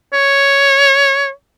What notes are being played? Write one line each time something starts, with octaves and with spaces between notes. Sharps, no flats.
C#5